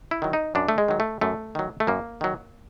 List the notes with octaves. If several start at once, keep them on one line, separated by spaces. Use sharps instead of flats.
E4
D#3 F#3
D#4
F#2 D4
A3
G#3
D#3 F#3
A3
F#2 A3
D#3 F#3
A3
F#2 A#3
D#3 F#3